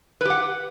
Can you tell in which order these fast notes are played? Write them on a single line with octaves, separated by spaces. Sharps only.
B4 G4 F#5